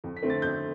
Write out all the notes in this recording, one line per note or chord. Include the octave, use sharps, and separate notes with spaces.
F2
B6
D3 A3 C4
A6
F2 G6